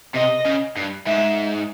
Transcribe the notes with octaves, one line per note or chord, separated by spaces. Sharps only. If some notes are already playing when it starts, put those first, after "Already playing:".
C3 D#5
C#3
G2
G#2 E5